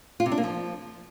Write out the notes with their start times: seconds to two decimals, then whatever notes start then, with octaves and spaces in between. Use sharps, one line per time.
0.20 F4
0.26 C3
0.32 D4
0.38 A#3
0.43 F3